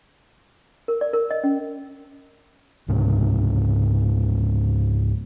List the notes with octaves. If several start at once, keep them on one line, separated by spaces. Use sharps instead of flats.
A#4
D5
A#4
D#5
C#4
C#2 G#2 C3